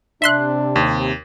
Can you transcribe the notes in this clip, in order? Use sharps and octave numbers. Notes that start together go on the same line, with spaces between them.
C3 D4 E5 C6 F#6
D#2